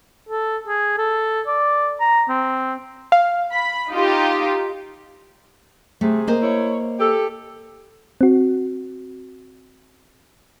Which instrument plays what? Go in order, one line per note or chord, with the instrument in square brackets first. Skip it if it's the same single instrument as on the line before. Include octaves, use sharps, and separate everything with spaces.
[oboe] A4
G#4
A4
D5
A#5
C4
[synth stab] F5
[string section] B5
D#4 F4 G4
[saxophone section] C3 G#4 [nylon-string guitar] A3
[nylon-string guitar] A#3 C5 D#5
[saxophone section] E4 C#5
G4 A4
[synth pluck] C4 F#4